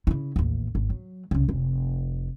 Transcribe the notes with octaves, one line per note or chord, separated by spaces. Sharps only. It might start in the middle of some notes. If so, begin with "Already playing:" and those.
C#3 E4
A1 D#2
G#1
F#3
C2 C#3
F1